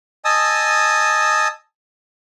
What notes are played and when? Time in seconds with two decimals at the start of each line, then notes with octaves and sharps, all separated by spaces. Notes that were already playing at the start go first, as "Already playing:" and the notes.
0.25 D#5 G#5 A5 D#6 E6